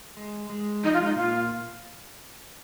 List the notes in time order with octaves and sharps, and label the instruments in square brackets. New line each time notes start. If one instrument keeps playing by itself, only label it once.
[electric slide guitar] G#3
G#3
[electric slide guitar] F3 [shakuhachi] D#4
[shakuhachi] F4
[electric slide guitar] G#3
[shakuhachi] D#4
[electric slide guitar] A#2 A#3 [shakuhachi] F4